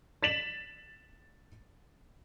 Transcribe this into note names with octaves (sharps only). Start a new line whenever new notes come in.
A6 B6 E7 F#7